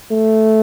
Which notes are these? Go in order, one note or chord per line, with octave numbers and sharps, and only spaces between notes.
A3